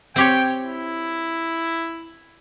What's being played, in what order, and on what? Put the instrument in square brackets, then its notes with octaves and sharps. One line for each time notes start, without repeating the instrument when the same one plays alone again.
[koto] C4 G4 C#5 [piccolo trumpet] G5
[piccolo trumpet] E4